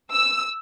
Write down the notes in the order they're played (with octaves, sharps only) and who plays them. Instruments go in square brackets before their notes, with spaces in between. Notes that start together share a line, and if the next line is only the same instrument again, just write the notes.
[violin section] E6